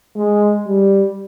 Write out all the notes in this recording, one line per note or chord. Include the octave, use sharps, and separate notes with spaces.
G#3
G3